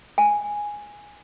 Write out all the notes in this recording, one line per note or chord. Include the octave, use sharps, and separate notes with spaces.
G#5